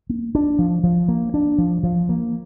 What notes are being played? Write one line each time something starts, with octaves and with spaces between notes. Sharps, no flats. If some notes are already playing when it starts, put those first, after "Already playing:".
A#3
D4
F3
F3
A#3
D4
F3
F3
A#3